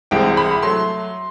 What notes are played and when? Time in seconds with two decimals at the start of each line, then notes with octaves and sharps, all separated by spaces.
0.11 C2 C3 E3 G#3 G5
0.37 B5
0.62 F#3 A3 C6